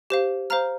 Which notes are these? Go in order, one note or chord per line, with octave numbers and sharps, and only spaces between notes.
G4 C5 F5
C5 F5 A#5 F6